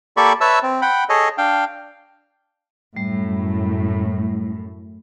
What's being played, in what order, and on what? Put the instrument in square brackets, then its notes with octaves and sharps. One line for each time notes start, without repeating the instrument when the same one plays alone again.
[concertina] A#3 G4 A4 D5 B5 C#6
B4 C#5 E5 A5 E6
C4
F#5 G5 B5
G#4 A4 C#5 D#5
D4 F5 G5
[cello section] F#2 A2 [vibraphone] G3